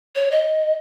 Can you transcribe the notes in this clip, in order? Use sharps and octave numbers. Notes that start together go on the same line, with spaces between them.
C#5
D#5